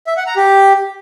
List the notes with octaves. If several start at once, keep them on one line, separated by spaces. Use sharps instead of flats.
E5
F#5
A#5
G4